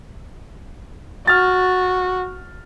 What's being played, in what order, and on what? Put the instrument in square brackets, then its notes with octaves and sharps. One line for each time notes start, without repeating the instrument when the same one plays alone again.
[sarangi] F#4 [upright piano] F6 A6